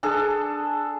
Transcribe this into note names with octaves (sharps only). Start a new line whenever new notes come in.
D4 G#4 A4